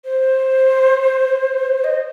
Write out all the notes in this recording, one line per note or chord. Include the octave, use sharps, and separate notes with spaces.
C5
D#5